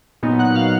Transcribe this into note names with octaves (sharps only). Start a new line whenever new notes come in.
A#2 F#3 B3 D#4
F#5 F#6
F5 F6